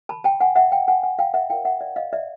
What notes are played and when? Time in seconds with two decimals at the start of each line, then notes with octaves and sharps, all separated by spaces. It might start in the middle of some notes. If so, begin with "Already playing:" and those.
0.09 A5 B5
0.24 G5 A5
0.40 F#5 G#5
0.56 E5 F#5
0.72 F5 G5
0.88 F#5 G#5
1.03 F#5 G#5
1.19 F5 G5
1.34 E5 F#5
1.50 F4 A#4 C#5 F5 G5
1.65 E5 F#5
1.80 D5 E5
1.96 D#5 F5
2.13 D5 E5